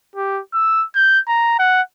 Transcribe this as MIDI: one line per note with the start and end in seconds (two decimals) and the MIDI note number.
0.16 0.41 67
0.54 0.85 88
0.95 1.19 91
1.28 1.56 82
1.59 1.82 78